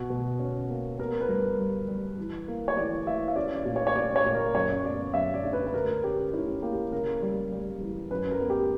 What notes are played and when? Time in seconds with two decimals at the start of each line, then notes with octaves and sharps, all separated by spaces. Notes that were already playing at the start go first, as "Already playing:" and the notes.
Already playing: B2 F#4
0.10 B2
0.40 C#4
0.69 A#3
0.99 B3 A#4
1.21 B4
1.29 G2 A#4
1.58 G3
1.88 G3
2.18 E3
2.48 A#3
2.68 C#5
2.77 E3 D5
3.06 E3 E5
3.28 E5
3.36 C#4 D5
3.55 D5
3.65 A#2
3.76 C#5
3.87 C#5
3.95 C#4 D5
4.16 C#5
4.26 A#2
4.35 A#4
4.55 F#2 C#5
4.84 B3 D5
5.14 F#2 E5
5.34 D5
5.43 D4
5.53 B4
5.67 B4
5.74 D2 A#4
6.03 C#4 G4
6.33 C#4 E4
6.62 A#3 G4
6.92 C#3 A#4
7.22 G3
7.52 G3
7.81 E3
8.11 F#2 B4
8.31 A#4
8.41 B3
8.50 G4